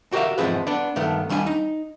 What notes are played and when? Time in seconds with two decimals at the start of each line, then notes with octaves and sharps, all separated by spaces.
0.12 F#4 G4 A#4 D5 E5 F5
0.38 E2 G#2 F3 C4 G#4 B4
0.67 B3 D4
0.96 G2 D#3 A3 B3
1.29 D#2 G3 D4 D5 G#5
1.47 D#4